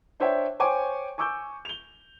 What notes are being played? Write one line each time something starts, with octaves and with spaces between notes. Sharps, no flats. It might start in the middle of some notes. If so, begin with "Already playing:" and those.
D4 C5 C#5 E5 G5
C5 C#5 G5 G#5 C#6 D6
G#5 C#6 D6 E6 G6
F7 G7